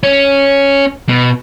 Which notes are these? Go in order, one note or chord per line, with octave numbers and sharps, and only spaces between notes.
C#4
B2